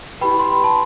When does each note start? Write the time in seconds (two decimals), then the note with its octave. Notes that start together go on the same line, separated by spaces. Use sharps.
0.21 E4 G4 B4 G5 B5
0.40 C6
0.52 B5
0.64 A5 C6